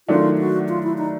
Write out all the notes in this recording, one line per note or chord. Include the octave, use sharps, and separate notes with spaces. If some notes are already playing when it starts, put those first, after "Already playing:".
D#3 F#3 A3 D4 F4
F#4
F4
E4
D#4